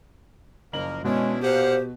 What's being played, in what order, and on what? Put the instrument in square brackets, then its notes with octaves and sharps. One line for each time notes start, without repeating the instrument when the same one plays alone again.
[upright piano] F#1 F#7 [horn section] F3 A#3 A#4
[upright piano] B2 [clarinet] G#3 [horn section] C#4 D4 E4
[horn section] A#2 F5 F#5 [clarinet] G4 [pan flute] C5